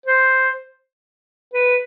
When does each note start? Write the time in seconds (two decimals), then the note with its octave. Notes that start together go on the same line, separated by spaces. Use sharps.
0.06 C5
1.54 B4